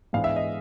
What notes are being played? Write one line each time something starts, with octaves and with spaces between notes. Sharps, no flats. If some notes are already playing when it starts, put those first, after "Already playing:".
G#2 E3 G#3 B3 D4 F5
E5
D#5